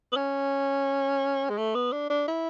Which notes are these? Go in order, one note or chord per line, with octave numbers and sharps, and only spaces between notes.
B3
C#4
G#3
A3
B3
D4
D4
E4